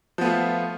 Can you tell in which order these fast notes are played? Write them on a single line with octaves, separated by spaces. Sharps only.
F3 B3 A3 F4